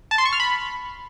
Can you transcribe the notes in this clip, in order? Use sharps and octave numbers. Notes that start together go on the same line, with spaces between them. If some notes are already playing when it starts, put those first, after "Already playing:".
A5
C6
C#6
F6
B5